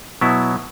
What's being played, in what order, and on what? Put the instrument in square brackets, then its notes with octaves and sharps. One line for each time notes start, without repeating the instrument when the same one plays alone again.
[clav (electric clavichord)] B2 F#3 B3 E4